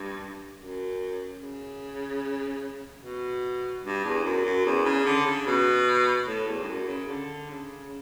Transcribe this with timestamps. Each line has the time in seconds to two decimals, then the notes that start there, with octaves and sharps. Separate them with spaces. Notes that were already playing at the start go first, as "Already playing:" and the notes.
Already playing: G2
0.58 F#2
1.40 C#3
3.02 B2
3.84 G2
4.04 E2
4.24 F#2
4.45 F#2
4.65 E2
4.85 C#3
5.05 D3
5.26 C#3
5.47 B2
6.27 A2
6.47 E2
6.63 G2
6.68 F#2
6.88 C#3
7.09 D3
7.50 C#3